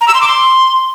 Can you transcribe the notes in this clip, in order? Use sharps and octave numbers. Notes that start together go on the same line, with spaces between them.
A#5
E6
C6
D6
C6